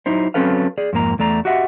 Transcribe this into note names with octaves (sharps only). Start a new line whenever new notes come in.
F#3 D#4 E4 C5
F#3 C4 C#4 A4 B4 F5
G#4 D5
F2 G#2 A#3 A#5
E2 A3 D5 A#5
F#4 G4 D#5 E5 F#5